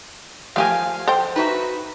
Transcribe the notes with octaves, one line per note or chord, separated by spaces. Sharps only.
F3 A3 G4 A#4 E5 F5 G#5
A4 C5 G5
D#4 F#4 B4 E5